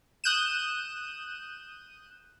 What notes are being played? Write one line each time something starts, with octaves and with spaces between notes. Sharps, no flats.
D#6 F#6 G6 D#7 E7